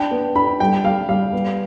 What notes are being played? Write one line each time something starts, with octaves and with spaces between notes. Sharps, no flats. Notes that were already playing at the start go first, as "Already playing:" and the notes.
Already playing: D4 G5
B3
D4 B5
G3 G5
G3 F5
G3 F5
B3